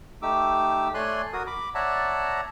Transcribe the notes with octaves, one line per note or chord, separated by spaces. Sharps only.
A3 D#4 G4 D6 E6
A3 C#5 D5 G#5 C6 F#6
F#4 A#4 D#6
B5 D6
C#5 D5 E5 F#5 A5 A#5